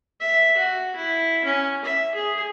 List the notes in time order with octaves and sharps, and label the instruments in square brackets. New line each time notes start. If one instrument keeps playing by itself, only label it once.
[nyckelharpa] E5
F#4
E4
C#4
E5
G#4